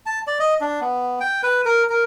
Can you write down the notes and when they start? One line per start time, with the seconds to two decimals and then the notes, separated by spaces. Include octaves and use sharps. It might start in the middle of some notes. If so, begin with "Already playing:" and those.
0.06 A5
0.27 D5
0.40 D#5
0.61 D4
0.81 B3
1.20 G5
1.43 B4
1.65 A#4
1.90 A#4